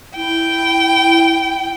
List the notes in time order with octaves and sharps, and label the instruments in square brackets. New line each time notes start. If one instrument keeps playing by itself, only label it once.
[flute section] E4 [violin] G5